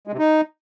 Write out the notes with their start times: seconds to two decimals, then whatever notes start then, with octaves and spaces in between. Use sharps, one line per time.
0.07 G#3
0.13 C3
0.19 D#4